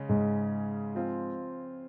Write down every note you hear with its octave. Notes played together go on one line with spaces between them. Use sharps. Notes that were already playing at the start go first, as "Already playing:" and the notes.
Already playing: C#3 G#3 C#4
G#2
F3 C4 F4